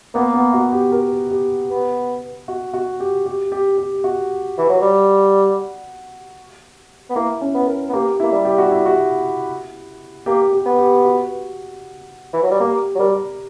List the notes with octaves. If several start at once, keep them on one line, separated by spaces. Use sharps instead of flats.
A#3 B3
B3
F#4
G4
A#4
G4
B3
F#4
F#4
G4
G4
G4
G4
F#4
E3
F#3
G3
B3
A#3 E4
C#4
B3
A#4
B3
A#3 G4
E4
A#3
G3
G4
F#4
E4
F#4
A#3 G4
G4
B3
G4
F#4
E3
F#3
G3
A#3 G4
F#3
G3 A#4